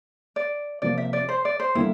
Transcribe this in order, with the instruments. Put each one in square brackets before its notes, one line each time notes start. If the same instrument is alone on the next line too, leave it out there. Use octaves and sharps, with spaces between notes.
[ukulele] D5
[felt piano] C3 F3 A#3 [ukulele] D5
[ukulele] E5
D5
C5
D5
C5
[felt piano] D3 G3 A#3 [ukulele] E4